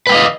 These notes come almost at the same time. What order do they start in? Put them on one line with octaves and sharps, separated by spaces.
B4 G5 F5 D#5